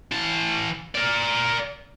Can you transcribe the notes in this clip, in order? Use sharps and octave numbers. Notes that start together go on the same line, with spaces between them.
E3 A5
A#4 D5